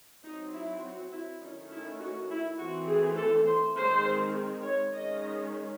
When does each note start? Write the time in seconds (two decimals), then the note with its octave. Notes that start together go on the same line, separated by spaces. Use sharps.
0.24 F#3 C4 D#4
0.53 E4
0.83 F#4
1.12 E4
1.42 D#3 A3 C#4 D#4
1.71 E4
2.00 F#4
2.29 E4
2.58 E3 A3 C4 F#4
2.87 G#4
3.16 A4
3.45 C5
3.75 D#3 G#3 C4 C5
4.62 C#5
4.91 D#3 G#3 C#4 D#5